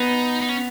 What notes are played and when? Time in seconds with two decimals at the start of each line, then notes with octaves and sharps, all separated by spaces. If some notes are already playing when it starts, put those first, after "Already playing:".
Already playing: B3 D#4
0.41 D#4
0.49 C#4